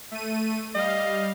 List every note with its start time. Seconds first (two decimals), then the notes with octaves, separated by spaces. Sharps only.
0.11 A3 D#7
0.75 G3 D#5 F5